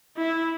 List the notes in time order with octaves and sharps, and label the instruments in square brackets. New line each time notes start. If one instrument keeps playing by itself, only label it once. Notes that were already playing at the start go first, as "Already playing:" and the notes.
[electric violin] E4